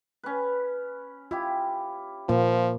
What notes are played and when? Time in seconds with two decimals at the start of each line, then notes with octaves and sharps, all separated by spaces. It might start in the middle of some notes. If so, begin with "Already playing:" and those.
0.23 C#4 B4
1.31 E4 F4 G4
2.29 A#2 F3 A#3 F4